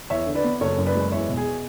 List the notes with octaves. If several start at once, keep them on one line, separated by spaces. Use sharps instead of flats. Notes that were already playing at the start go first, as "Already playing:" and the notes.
E2 C#5 E5
D3
B4 D5
B3
F#1 A4 C#5
F#2
B4 D5
G#3
E2 C#5 E5
B2
G#4